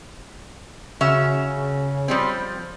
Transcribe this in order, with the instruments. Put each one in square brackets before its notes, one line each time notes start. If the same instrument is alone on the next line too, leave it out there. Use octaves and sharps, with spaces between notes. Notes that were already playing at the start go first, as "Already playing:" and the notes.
[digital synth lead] C#3 [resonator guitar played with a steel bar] C#4 F#4 E5
[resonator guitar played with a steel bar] F3 G3 C4